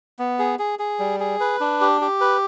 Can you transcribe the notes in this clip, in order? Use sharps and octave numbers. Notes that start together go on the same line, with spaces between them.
B3
G#4
G#4
G#4
G3
G#4
B4
D4
G4
G4
B4